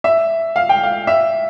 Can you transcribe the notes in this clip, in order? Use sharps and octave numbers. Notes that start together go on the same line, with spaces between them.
E5
F5
G5
F5
E5